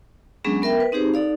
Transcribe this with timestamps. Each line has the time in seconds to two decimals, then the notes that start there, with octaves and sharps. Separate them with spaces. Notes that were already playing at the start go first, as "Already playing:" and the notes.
0.44 F#3 G#3 B3 C#4 D4 G#4
0.62 B3 A#4 E5 G5
0.80 B4
0.92 C4 D#4 G4 G#4 C5
1.14 D#4 A4 D5 F5